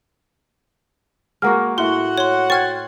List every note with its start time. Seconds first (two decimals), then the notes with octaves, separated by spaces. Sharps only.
1.42 G#3 A#3 F#4 A#4 F#5 F6
1.78 A2 F#4 E5 F#5 C6 G7
2.18 C#5 C6
2.50 C5 G5 C#6 F6 G#6 A6